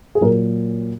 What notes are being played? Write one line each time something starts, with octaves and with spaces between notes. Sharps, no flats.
G#4
A#2 F#3 A#4